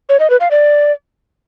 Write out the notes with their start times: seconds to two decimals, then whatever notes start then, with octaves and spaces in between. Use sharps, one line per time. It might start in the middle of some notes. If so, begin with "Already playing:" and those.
0.09 C#5
0.20 D#5
0.30 B4
0.40 F5
0.51 D5